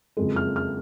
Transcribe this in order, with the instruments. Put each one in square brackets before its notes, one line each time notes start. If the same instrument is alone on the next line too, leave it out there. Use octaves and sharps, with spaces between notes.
[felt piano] F#1 F2 F3 G#3
F6
F6